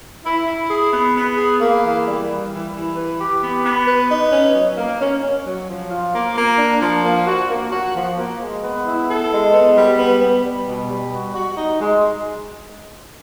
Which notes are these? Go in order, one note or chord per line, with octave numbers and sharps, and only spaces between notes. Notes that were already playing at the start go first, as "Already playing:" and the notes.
E4
E4
G#4
B3
B3
G#4
A#3
E3
G3
G3
E3
E3
B4
G4
B3
B3
B4
D#4
C#4
F#3
A#3
C#4
C#4
F#3
F3
F4
A#3
A#3
D4
F3
A#3
F#4
A#3
F#4
F3
A#3
G#3
B3
E4
A4
G#3
B3
G3
B3
B3
G3
B2
G3
F#4
F#4
D#4
G#3